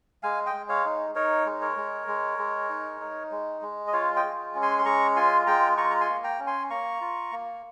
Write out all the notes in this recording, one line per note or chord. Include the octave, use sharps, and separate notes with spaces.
G#3 F5 G#5
D#5 G5
G#3
C#5 F5
D#4
D#4 A#4 C#5
G#3
A#4 C#5
G#3
G#3
G#3
D#4
D#4
G#3
G#3
D#5
F4 C#5 F5
D#5 G5
G#3
C#4
G#5 C6
C6
G#3 A#5 C#6
F4 G#5 C6
G#3 G5 A#5
F4 A#5 C#6
A#5
G#5 C6
A#3
G5 A#5
C#4
G#5 C6
A#3 A#5 C#6
F4
A#3